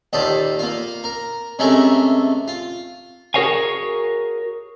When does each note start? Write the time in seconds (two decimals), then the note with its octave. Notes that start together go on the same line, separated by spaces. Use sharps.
0.13 D#2 A#2 G4 A4 D5 D#6
0.59 A#3 F4
1.04 A#4
1.59 C3 G#3 A3 C#4 A4 A#4
2.48 F4
3.34 F#4 G#4 A#4 C#5 F5 G#5